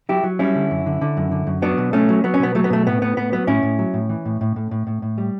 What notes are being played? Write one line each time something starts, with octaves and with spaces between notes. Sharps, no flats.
F#3 E4 G4
F#3
G3 C#4 E4
D3
F#2
D3
D3
F#2
D3
F#2
F#3 B3 D4
B2
F#3 A3 C#4
F#3
F#3 B3
C#4
B2 B3
F#3 A3
B3
B2 A3
A2 B3
A2 B3
A2 B3
F#3 B3
A2 C#4 E4
A2
F#3
A2
E3
A2
A2
A2
A2
A2
A2
G3